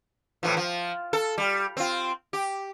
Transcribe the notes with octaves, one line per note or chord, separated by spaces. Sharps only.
A2 E3 F3
F3
A4
G3
C4 F4
G4